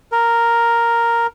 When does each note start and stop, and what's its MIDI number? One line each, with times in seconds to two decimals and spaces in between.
0.12 1.27 70